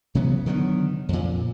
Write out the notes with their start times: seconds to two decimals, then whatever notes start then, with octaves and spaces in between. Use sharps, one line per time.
0.15 C3 E3 F#3 B3
0.46 D3 D#3 F#3 B3
1.09 F2 A#2